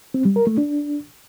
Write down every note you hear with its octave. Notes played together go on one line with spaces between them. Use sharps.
C4
G3
A#4
A3
D4